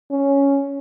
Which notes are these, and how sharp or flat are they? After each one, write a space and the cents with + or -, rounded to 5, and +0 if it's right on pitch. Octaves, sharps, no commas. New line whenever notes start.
C#4 +5